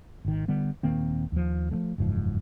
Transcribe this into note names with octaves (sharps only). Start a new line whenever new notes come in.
G#1 D#3
D3 G3 B3
D#1 D#3 A#3 C4
D#2 F3
F3 G#3 A3
F#1 E2 G#2 F3